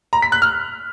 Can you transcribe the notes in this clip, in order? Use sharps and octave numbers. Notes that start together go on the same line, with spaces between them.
A#5
B6
F#6
F6